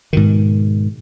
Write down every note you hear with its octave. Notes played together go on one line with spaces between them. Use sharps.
G#2 B2 D#3